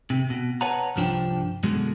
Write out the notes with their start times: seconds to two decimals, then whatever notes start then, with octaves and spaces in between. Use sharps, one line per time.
0.10 C3
0.30 B2
0.61 B4 C#5 F#5 A5 A#5
0.96 C2 G2 F3 D4 C5 G5
1.63 F#2 B2 D3 F#3 G#3